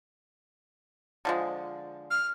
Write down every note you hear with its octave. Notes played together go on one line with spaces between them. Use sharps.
D3 F3 G#3
F6